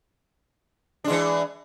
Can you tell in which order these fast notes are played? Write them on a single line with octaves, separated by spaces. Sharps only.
D4 G#3 E3